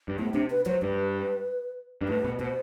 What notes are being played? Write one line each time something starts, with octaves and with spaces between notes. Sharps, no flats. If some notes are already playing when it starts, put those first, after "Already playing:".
G2
A2 B3
C3 D4
B4
F#3 C5
G2 B4
G2
A2 B4
B2
B2 C5